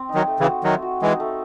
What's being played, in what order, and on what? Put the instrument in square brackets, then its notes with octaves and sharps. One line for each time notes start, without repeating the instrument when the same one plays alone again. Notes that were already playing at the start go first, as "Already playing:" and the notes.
Already playing: [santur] C4
D#4
[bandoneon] D#3 F#3
[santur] A3
[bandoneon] C#3 E3
[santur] F#4
[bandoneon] D#3 F#3 [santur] A3
[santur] F#4
[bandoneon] E3 G#3 [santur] D#4
[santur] A3